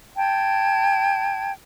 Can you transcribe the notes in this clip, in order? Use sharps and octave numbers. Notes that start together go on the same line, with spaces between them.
G5 A5 G#6